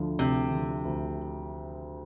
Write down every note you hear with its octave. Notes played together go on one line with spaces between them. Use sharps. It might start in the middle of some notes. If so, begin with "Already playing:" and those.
Already playing: D2 D3 F3
D2 C3
D3 F3
D2